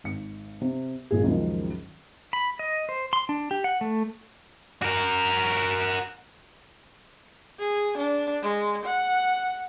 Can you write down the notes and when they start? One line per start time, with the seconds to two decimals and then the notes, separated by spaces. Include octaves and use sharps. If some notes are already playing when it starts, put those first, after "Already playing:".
0.04 G#1 C#7
0.61 C3
1.11 G#1 A#2 G#4
1.23 C#2 F#2 D#3 F3 G#3
2.33 B5
2.59 D#5
2.89 C5
3.13 C6
3.29 D4
3.51 G4
3.64 F#5
3.81 A3
4.82 F#4 A#4
7.59 G#4
7.97 D4
8.42 G#3
8.85 F#5